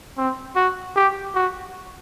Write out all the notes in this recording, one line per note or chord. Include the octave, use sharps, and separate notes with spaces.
C4
F#4
G4
F#4